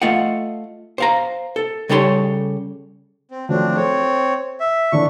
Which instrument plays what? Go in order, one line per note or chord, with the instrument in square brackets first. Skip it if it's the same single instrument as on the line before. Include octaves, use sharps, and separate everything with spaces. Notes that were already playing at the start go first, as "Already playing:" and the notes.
[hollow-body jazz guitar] A3 F4 D#5 F#5
C5 F5 A#5
A4
C#3 G3 A4 C#5 A#5 C6
[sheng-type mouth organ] C4
[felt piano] F3 F#3 A3 [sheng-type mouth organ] C4 D4
[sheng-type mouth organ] C4 C#5 [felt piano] A4
[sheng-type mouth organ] E5
[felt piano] D3 E3 D4 [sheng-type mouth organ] C#6